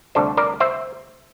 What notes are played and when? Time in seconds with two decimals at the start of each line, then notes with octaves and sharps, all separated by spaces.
0.15 D2 C3 G3 D4 A4 C5
0.37 A#4 D5
0.60 C5 E5